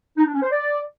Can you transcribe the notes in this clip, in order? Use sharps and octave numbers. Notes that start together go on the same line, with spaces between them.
D#4
D4
C#4
C5
D5